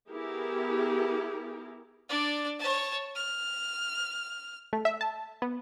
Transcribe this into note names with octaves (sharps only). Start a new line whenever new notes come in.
B3 E4 G4 G#4 A#4
D4 D5
C#5 A5
F6
A3
E5
A5
B3